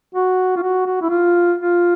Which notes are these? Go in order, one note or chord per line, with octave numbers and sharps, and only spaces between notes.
F#4
F4
F#4
F#4
E4
F4
F4